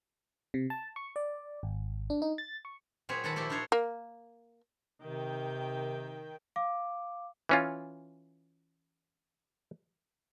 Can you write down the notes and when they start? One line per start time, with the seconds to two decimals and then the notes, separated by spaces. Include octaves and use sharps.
0.54 C3
0.70 A5
0.96 C#6
1.16 D5
1.63 G#1
2.10 D4
2.22 D#4
2.38 A6
2.65 C#6
3.09 A#2 F#3 C4 G#4 B4 C#5
3.24 D#3 F#4 A4 B4 F#5
3.36 A#2 F3 E4 G4 A4
3.50 D4 D#4 F4 C5 C#5
3.72 A#3
5.02 C3 D#3 G5
6.56 F5 D6
7.49 E3 C#4 F4